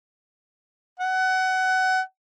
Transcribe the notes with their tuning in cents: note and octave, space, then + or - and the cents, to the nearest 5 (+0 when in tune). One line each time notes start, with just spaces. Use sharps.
F#5 +20